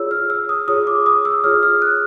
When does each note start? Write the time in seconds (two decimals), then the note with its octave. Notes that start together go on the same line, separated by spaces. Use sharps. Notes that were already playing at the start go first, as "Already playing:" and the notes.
Already playing: F4 G#4 C#5 E6
0.11 F6
0.30 E6
0.49 D#6
0.68 F4 G#4 C#5 D#6
0.87 D6
1.06 D#6
1.25 E6
1.44 F4 G#4 C#5 F6
1.63 F6
1.82 F#6